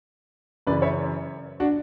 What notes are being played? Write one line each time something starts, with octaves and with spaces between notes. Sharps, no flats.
F#2 C#3 E3 B4 D5
C#5 E5
D4 F#4